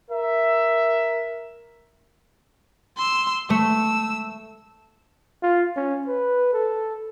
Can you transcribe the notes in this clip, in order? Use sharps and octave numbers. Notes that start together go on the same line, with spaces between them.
A#4 E5
C6 E6
A3 E6
F4
C#4
B4
A4